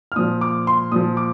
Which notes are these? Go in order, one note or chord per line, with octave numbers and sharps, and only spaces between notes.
F6
A#2 F3 D#6
D6
C6
A#2 F3 D#6
D6